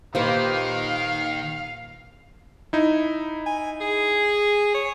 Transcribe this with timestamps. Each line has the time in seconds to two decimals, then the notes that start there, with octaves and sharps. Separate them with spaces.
0.15 A#2 D#3 A#3 G4 B4 C5 F5
2.73 D#4 E4
3.46 G#5
3.81 G#4
4.74 C#5